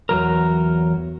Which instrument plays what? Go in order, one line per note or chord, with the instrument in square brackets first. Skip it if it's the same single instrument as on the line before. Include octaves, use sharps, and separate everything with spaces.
[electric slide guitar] E2 F#3 A#4